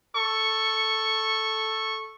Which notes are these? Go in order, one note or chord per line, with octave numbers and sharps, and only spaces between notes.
A4 C#6